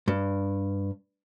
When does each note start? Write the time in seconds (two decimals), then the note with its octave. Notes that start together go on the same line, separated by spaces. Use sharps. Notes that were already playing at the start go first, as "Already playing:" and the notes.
0.08 G2